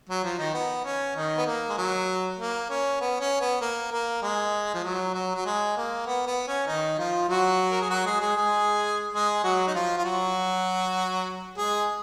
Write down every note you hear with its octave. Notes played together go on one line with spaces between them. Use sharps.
F#3
F3
D#3 D#4
B3
C#4
D#3 D#4
B3
A#3
G#3
F#3
A#3
C#4
B3
C#4
B3
A#3
A#3
G#3
F3
F#3
F#3
F#3
G#3
A#3
B3
B3
C#4
D#3 D#4
F3 F4
F#3 F#4
A#4
G#4
F#3 F#4
G#3 G#4
G#3 G#4
G#3 G#4
G#3 G#4
F#3 F#4
D#4
F3 F4
F4
F#3 F#4
G#3 G#4